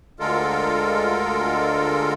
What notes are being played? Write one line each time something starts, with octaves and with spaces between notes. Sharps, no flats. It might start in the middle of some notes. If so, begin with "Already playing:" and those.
D2 D3 G#3 F4 A4 A#4